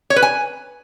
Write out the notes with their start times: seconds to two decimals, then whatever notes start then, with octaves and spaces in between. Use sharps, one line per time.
0.10 C#5
0.16 B4
0.22 G#5